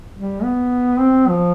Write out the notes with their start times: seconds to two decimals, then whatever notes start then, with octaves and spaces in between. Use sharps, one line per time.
0.16 G3
0.43 B3
1.00 C4
1.28 F3